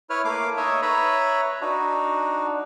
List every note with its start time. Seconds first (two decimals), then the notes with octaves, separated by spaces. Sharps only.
0.10 E4 B4 C#5 F6
0.25 A3 A#3 F5 D6
0.57 D#4 C#5 D#5 E5
0.82 B4 C#5 E5 A#5 B5
1.61 D4 D#4 F#4